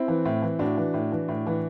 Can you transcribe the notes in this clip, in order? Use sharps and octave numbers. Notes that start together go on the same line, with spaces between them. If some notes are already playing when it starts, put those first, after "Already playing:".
Already playing: C4 E4
E3
A2
E3
A2 D4 F#4
E3
A2
E3
A2
E3